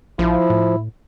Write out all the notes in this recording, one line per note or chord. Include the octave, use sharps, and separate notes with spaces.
A#1 F3 E4
A2